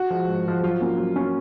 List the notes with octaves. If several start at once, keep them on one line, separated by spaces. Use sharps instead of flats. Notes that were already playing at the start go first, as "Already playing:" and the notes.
Already playing: F#4
F3 G#3
G#2
F3 G#3
F#3 F4
A#3 C#4
F#3
A#3 C#4